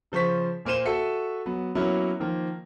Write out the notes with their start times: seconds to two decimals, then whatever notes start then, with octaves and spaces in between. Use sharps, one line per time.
0.12 C#3 F3 C5 C#6 B6
0.65 A#2 A#3 C5 D#7 E7 G7
0.85 F#4 A4 E5 C#7
1.46 F#3 B3
1.75 F#3 A#3 B3 C#4 E4
2.20 D#3 F3 A#3